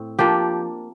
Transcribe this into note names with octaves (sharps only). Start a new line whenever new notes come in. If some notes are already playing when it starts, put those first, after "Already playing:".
Already playing: A2 C4
F3 A#3 D4 G4